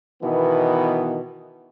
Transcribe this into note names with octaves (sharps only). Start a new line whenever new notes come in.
B2 D#3 E3 B3